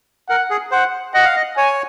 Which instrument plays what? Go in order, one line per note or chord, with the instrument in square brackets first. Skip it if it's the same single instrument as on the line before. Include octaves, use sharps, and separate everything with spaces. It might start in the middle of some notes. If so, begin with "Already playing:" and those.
[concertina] A#4 [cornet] F#5
[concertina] G#4
[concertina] C5 [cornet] F#5
[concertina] D#5 [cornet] F#5
[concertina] F5
D#5
[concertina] C#5 [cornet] G#5